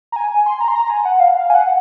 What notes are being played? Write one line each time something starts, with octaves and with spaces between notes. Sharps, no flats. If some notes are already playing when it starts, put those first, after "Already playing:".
A#5
G#5
G#5
C6
A#5
C6
A#5
G#5
F#5
F5
F5
G#5
F#5